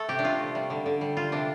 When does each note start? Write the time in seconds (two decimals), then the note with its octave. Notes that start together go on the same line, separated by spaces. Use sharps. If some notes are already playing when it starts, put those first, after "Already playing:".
Already playing: A3 A4
0.09 C3 G4
0.19 D4
0.24 C3 F4
0.39 A3
0.55 G3
0.70 D3
0.86 D3
1.01 G3
1.17 G3 F4
1.32 C3 D4